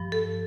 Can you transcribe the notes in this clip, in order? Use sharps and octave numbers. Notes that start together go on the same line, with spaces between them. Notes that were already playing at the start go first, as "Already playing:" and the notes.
Already playing: G2 F3
A4